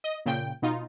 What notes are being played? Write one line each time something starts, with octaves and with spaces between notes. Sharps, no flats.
D#5
A#2 C#3 G5
B2 D#4 F4